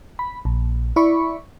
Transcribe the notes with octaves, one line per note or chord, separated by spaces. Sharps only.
B5
A#1
E4 D5 B5 C#6